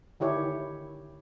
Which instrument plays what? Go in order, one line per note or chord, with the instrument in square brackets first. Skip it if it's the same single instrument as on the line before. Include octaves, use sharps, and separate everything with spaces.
[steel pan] D3 D#3 E4 G4 C#5